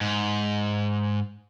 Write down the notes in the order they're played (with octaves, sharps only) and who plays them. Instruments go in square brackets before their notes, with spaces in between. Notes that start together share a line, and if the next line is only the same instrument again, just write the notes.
[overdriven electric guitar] G#2